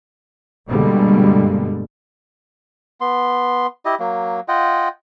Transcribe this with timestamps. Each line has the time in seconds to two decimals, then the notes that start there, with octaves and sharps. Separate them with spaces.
0.67 G2 B2 D3 G3 G#3 A#3
3.01 B3 C6
3.85 E4 G4 D#5
4.00 F#3 A#3
4.48 F4 D#5 F#5 G5